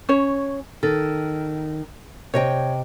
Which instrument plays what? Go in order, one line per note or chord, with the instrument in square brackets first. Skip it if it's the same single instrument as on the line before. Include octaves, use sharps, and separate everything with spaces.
[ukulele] C#4 C#5
[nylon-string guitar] D#3 [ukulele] A4
[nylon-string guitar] C3 D#5 G5 [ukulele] C#5